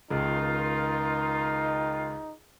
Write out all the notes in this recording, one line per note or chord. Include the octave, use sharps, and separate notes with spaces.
C#2 D#3 D#4 F4